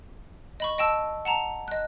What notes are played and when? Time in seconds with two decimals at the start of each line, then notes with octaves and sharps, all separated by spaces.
0.60 D#5 B5 C#6
0.78 D#5 G5 A5 E6
1.25 F#5 A5 A#5
1.68 D#5 F#6